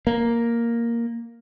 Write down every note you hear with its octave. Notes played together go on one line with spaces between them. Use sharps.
A#3